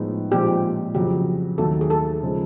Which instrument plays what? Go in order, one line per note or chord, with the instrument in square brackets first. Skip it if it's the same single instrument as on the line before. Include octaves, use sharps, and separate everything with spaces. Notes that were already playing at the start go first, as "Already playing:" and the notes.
Already playing: [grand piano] A2 F3 G#3 B3 D#4
[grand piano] A#2 F3 G#3 C4 [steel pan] G4
[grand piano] F2 C#3 F#3 [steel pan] G4
[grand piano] D#2 D#3 F#3 A3 [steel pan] A4
[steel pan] G#4
A4
[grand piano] C#3 F3 G#3 C#4